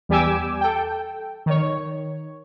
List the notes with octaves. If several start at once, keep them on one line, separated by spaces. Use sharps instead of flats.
E2 G3 G4 G#5 D6 E6
A4 G5
D#3 C#5